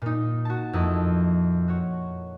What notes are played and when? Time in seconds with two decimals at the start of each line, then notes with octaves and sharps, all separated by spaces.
0.02 A#2 D#4
0.45 F#4 A5
0.73 F2 A#3 E4 D#5
1.68 F#4 C#5